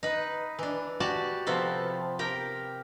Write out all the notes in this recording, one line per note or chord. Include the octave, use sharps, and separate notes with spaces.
D#4 B4
E3 D4
F#4 G4 D5 A5
C3 F3 B3 A4
G4 A#4 G5